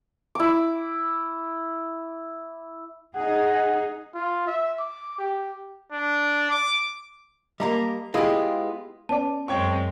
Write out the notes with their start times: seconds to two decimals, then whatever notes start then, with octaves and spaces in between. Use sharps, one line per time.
0.35 E4 D6
3.15 D#4 G#4 F#5
4.15 F4
4.47 E5
4.79 D6
5.19 G4
5.92 D4
6.51 D6
7.60 G3 A#3 D#5 A#5
8.14 G#3 B3 E4 F4 G4 G#4
9.09 B3 C#4 D5 A5
9.48 F#2 G#3 C4 C#5 G5 C#6